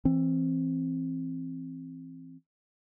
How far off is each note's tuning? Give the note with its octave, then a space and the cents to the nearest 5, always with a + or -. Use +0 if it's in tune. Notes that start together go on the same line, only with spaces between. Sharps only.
E3 +0 C4 +15